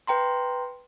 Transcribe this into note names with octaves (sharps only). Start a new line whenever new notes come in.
B4 G5 A#5 C6